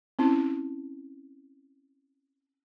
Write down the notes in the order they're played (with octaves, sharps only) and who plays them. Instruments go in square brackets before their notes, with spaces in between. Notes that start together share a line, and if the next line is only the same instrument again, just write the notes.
[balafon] C4 C#4 E4